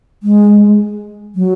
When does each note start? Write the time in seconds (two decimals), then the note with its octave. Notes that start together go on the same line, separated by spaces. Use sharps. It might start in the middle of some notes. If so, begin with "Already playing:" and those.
0.23 G#3
1.36 F#3